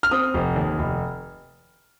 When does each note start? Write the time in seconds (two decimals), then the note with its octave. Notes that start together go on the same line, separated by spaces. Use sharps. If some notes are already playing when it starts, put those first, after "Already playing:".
0.03 F6
0.11 C4 D#6
0.34 F1
0.56 D#2
0.79 F1